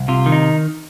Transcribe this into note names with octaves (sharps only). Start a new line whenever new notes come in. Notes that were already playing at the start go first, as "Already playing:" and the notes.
Already playing: C2
C3 F4
D#3
D#4